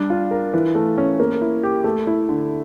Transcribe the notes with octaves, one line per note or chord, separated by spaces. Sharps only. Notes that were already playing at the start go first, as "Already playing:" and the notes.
Already playing: G3 D4
F4
A#4
E3
A3
C#4
A#3
E4
G4
A3
E4
D3